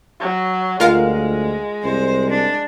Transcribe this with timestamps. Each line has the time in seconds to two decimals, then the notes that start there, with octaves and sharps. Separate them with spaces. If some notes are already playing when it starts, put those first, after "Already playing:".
0.20 F#3
0.80 D2 G#3 F4 A#4 F5
1.84 C2 C5
2.30 D4